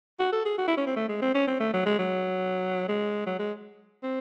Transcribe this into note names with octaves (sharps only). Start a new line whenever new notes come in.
F#4
A4
G#4
F#4
E4
C#4
C4
A3
G#3
C4
C#4
C4
A3
F#3
G#3
F#3
G#3
F#3
G#3
C4